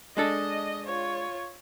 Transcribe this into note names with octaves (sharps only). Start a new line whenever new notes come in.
G#3 D4 A4 D#5
F4 C#5